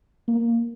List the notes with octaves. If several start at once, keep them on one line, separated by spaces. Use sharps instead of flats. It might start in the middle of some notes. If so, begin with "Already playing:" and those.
A#3